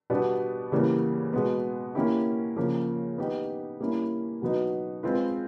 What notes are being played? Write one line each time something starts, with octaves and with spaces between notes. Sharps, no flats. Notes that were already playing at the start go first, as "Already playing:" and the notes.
B2 G3 B3 D4
C#3 E3 G3 A#3
B2 G#3 B3
A#3 C#4 E4 G4
C#3 F3 A#3
B3 D#4 G4
G3 A#3 C#4 E4
B2 F#3 B3 D#4
G#3 C4 F4 G#4 B4